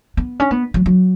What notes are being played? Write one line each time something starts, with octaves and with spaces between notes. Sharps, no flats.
B3
C#4
B3
F#3
F#3